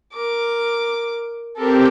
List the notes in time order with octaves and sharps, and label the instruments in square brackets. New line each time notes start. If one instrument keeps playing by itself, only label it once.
[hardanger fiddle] A#4 D6
[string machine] C4 G4 [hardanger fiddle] A4 A#4